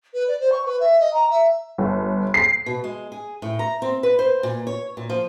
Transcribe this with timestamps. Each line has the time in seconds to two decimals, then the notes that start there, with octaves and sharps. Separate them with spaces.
0.14 B4
0.28 D5
0.40 C5
0.52 C#6
0.66 B4
0.80 E5
1.00 D#5
1.14 A#5
1.30 E5
1.78 G1
2.34 C7
2.66 B2
2.84 G#3
3.12 G#4
3.42 A2
3.59 A#5
3.82 C4
4.03 B4
4.19 C5
4.43 A#2
4.67 C#5
4.97 A#2
5.10 F3